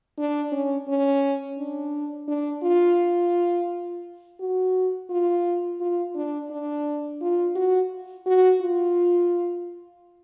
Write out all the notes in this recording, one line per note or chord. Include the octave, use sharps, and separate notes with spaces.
D4
C#4
C#4
D4
D4
F4
F#4
F4
F4
D4
D4
F4
F#4
F#4
F4